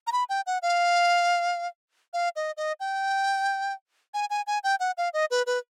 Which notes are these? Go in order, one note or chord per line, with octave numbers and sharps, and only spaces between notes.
A#5
B5
G5
F#5
F5
F5
D#5
D#5
G5
G#5
G#5
G#5
G5
F#5
F5
D#5
B4
B4